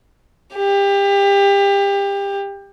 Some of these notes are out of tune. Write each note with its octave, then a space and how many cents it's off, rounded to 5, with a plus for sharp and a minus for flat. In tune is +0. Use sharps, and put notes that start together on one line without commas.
G4 +25